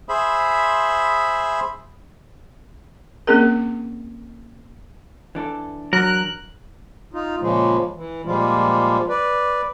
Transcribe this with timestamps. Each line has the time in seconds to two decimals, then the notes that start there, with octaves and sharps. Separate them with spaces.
0.09 G#4 C5 E5 B5
3.27 A#3 C4 C#4 G#4 A#4
5.35 E3 D4 A4
5.93 F#3 A#4 F#6
7.14 D#4 F4
7.40 A#2 C#3 F3 G#3
7.96 E3
8.25 A#2 F3 G3 G#3 F4
9.09 B4 D5